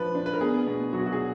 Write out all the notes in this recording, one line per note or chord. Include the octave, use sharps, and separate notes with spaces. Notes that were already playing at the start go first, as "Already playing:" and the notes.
Already playing: F3 D4 B4
D4
B4
A#4
B3 G#4
B2
F#3 F#4
F#4
G#4